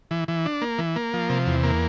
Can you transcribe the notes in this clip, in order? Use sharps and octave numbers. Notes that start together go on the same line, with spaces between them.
E3
E3
D4
A#3
E3
A#3
F3
C3
E2
A#3